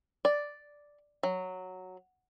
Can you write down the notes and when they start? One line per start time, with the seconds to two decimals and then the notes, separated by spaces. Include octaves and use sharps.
0.25 D5
1.23 F#3